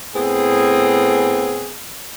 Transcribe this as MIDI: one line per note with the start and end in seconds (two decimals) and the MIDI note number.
0.15 1.76 45
0.15 1.76 59
0.15 1.76 60
0.15 1.76 68